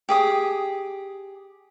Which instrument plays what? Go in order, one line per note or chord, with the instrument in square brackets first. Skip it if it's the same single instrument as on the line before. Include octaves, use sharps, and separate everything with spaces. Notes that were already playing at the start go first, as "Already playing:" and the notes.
[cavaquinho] G4 G#4 D#6